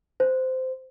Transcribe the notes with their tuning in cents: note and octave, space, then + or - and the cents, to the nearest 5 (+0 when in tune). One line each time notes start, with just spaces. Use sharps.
C5 -15